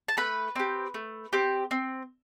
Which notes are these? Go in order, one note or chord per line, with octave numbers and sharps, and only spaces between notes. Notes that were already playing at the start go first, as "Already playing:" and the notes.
A5
A3 B4 B5
C4 G4
A3
C4 G4
C4